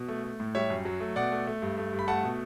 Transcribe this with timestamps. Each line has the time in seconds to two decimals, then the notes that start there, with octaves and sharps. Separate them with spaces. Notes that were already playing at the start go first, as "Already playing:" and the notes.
Already playing: B2
0.08 A3
0.24 A3
0.40 A2
0.55 G3 C#5 E5
0.70 F#2
0.85 F#3
1.00 A3
1.16 B2 D5 F#5
1.32 A3
1.47 A3
1.62 G2
1.78 A3
1.93 G2
1.99 B5
2.08 A3 F#5 A5
2.23 B2